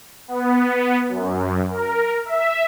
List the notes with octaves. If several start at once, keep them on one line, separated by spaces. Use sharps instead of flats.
B3
F#2
A#4
E5